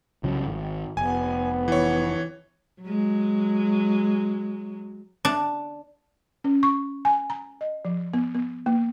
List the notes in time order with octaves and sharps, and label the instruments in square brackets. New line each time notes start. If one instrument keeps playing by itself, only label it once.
[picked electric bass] C2 C#3 F#3
G#1
[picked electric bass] F1 [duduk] B3 [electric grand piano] G#5
[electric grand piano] E3 C#5
[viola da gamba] F#3 G#3
[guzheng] D4
[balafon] C#4
C#6
G#5
A#5
D#5
F3
B3
B3
A#3